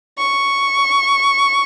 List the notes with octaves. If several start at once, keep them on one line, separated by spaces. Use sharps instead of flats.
C#6